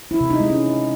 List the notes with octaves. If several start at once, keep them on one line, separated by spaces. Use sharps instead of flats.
E4
C3
D#4
G#3
C#4